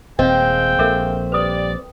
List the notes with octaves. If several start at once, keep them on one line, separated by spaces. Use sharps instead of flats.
D#1 A#2 G#3 C4 D#5 F5 G5
A#1 A4 A#4 E5
G3 G4 B4 D5 D#6